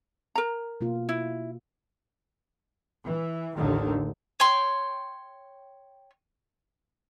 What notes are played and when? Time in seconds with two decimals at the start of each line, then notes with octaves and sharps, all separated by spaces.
0.35 A#4 A#5
0.81 B2 A#3 F4
1.09 E4
3.05 E3
3.55 A1 D#2 D3 D#3
4.40 C#5 G5 C6